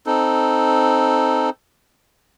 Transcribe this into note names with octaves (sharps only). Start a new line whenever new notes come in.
C4 D#4 A4